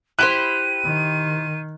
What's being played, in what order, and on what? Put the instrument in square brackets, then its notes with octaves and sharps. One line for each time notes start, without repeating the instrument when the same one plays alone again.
[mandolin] E4 G4 C5 [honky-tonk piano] F#6 [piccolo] D#7
[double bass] D#3